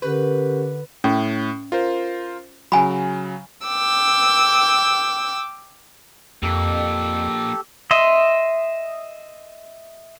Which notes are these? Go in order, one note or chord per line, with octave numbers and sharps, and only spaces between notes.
D3 C#4 G4 A#4 B4
A2 C#4
F4 A#4 C5
C#3 F#3 G#5 B5
G5 D6 E6
F2 F3 A#3 G4 A4
D#5 E5 C6